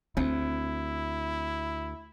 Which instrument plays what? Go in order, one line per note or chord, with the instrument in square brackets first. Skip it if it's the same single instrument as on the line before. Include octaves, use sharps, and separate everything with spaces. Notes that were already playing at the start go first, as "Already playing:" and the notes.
[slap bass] D2 [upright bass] C4 [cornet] E4